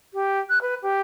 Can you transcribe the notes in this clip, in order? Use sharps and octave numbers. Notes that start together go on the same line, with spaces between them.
G4
F#6
B4
G4